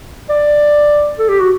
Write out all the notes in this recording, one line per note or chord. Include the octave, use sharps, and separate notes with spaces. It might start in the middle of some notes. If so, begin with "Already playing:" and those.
D5
A4
G4
F#4